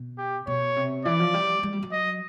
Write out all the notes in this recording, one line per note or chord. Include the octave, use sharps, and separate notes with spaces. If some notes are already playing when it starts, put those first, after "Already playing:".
Already playing: B2
G4
B2 C#5
C3
E3 D5
F3
G3
G#3
G3
F#3
D#5